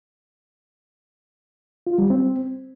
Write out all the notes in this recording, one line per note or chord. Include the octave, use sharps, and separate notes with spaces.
F4
G3
C4